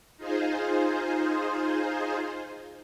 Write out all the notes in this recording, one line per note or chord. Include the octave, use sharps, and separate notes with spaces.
D#4 F4 G#4 C5